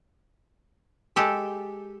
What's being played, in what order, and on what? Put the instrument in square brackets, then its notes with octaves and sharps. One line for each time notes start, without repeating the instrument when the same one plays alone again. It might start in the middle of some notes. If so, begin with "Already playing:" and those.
[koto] G#3 G4 A4